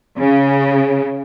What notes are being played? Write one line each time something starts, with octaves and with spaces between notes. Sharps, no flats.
C#3